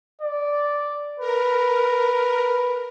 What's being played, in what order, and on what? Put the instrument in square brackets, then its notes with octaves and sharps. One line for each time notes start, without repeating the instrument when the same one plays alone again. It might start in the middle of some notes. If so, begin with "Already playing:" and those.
[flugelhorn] D5
[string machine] A#4 [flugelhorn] B4